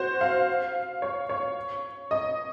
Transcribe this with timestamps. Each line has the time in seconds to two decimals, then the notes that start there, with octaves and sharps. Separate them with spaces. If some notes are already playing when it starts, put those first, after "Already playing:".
Already playing: F#4 C5
0.21 F5
1.02 C#5
1.29 C#5
2.11 D#5